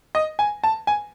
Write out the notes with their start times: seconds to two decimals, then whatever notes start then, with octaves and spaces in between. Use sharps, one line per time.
0.15 D#5
0.39 G#5
0.64 A5
0.87 G#5